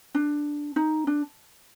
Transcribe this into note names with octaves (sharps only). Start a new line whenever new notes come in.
D4
D#4
D4